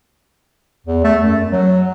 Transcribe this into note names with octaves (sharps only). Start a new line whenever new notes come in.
E2
A3
F#2
F#3